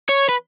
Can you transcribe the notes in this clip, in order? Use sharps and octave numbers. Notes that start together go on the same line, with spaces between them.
C#5
B4